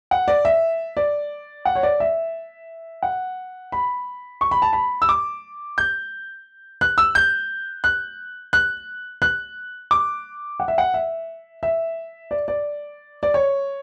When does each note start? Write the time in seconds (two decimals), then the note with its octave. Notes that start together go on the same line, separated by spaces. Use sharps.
0.11 F#5
0.28 D5
0.45 E5
0.97 D5
1.65 F#5
1.75 C#5
1.83 D5
2.00 E5
3.03 F#5
3.72 B5
4.41 C#6
4.51 B5
4.62 A5
4.73 B5
5.02 E6
5.09 D6
5.78 G6
6.81 F#6
6.98 E6
7.15 G6
7.84 F#6
8.53 F#6
9.22 F#6
9.91 D6
10.60 F#5
10.68 E5
10.78 F#5
10.94 E5
11.63 E5
12.31 D5
12.48 D5
13.23 D5
13.34 C#5